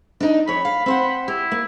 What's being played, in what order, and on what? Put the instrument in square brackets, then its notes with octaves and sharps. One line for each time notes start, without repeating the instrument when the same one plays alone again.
[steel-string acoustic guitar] D4 D#4
[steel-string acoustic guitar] F2 C#5 [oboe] B5
[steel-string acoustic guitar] F5
C4 C5 F#5
[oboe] E4 [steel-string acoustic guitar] G4
[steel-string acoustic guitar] A#3